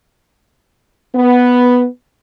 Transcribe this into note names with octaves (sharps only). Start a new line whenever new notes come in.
B3